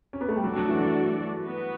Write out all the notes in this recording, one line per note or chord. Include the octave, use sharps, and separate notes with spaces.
C#4
B3
A3
G3
F#3 A3 D4 F#4 A4 D5
F#3
E3
F#3
B3 F#4 B4